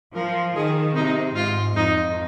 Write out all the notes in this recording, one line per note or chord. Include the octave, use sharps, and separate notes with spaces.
F3 A#4
D#3 G#4
C3 D#4
G#2 F4
F2 D#4